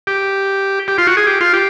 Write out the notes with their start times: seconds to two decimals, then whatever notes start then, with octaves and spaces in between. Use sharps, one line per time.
0.07 G4
0.88 G4
0.98 F4
1.07 F#4
1.17 G#4
1.27 G4
1.41 F4
1.54 G4